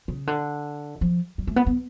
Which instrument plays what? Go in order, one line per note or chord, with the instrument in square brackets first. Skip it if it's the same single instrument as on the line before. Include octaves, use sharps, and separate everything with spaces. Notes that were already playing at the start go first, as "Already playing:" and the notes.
[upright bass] C#3
D3
F3
G3
A3
B3
B3